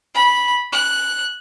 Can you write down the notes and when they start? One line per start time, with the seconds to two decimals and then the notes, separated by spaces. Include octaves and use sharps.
0.15 B5
0.73 F#6